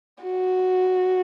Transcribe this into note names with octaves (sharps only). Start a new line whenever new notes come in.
F#4